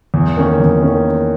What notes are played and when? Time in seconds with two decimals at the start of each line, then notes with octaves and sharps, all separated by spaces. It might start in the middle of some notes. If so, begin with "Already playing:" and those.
0.14 E2
0.37 D#3 A#3 C#4
0.60 E2
0.82 D#3 A#3 C#4